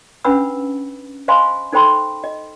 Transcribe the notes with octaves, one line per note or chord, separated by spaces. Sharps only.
C#4 D4 B4 F#5 B5 E6
C5 D#5 F5 G#5 B5 C6
D#4 A4 C5 G5 B5 C6
D#5